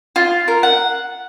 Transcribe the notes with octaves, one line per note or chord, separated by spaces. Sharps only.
F4
A#4
F#5